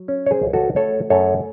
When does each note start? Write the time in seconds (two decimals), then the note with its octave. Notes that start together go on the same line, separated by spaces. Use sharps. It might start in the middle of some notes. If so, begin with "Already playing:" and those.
Already playing: F#3
0.08 C#4
0.26 C#5
0.31 G#4 C5
0.42 C#2
0.53 F#4 A4
0.76 A3 A4 C#5
1.10 F#2 A4 C#5